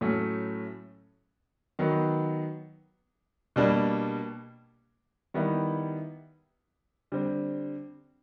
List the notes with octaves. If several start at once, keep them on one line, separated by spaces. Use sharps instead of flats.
A2 F#3 A3 C#4
D#3 F#3 B3
B2 G3 A#3 D4
D#3 G3 B3 E4
D3 G3 C4